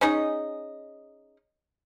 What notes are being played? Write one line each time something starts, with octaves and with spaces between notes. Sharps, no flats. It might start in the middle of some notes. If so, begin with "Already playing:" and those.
C#4 D#4 G#4 D#5